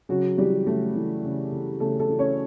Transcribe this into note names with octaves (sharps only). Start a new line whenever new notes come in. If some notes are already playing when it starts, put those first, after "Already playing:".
C#3 F#3 F#4
E3 G3 G4
C#3 A3 A4
E3
C#3
E3
C#3 A3 A4
A3 A4
E3
C#4 C#5